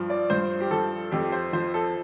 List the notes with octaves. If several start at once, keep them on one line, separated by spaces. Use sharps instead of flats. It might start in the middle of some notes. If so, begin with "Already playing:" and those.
Already playing: G2 F3
D5
G2 C5
G4
F3 A4
F2 G4
C5
F3 C5
A4